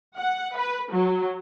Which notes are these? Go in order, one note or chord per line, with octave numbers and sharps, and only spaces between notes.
F#5
B4
F#3